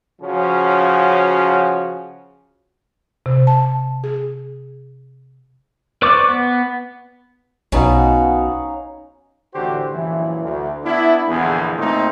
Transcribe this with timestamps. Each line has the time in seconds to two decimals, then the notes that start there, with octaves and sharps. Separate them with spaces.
0.22 C#3 F3 C#4 F#4
3.26 C3
3.47 A5
4.04 G#4
6.02 B4 C5 D5 C#6 D6
6.29 B3
7.72 B1 B2 C#4 D#4 F#4 F5
9.54 A1 D3 F#4 G4 C5
9.92 A#1 F#2 E3
10.43 D2
10.84 B3 D4 E4
11.28 A#1 E2 D3 B3 G#4
11.78 A#2 A3 A#3 C4 D#4